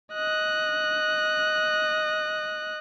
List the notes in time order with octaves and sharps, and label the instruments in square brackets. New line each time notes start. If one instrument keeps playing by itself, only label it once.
[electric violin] D#5 F#6